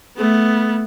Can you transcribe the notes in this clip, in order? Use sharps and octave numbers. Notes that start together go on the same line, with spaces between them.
A3 B3